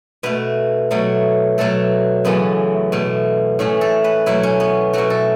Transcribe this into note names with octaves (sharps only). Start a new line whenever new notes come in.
B2 A3 B4
B2 F#3 A3
B2 F#3 A3 A4
F#2 C#3 E3 A3 B3
B2 A3
A2 E3 A3 C#4
A4
B4
B2 F#3 A3 E4
C#4
B3
B2 F#3 A3 F#4
A4